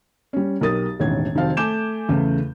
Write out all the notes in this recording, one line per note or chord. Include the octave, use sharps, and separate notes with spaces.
G3 C#4
B1 G4 A#4 D#6 A6
E1 A1 D#3 G#6
F1 D#3 F#3 C4 F5 A5
A3 G#5 D6 G6 E7
E2 C#3 A3